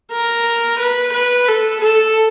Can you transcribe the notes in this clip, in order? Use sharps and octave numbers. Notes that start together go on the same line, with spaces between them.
A#4
B4
B4
A4
A4